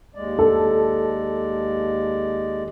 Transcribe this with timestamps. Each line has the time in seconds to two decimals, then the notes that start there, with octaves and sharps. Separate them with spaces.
0.15 D#2 G#3 D5
0.39 A4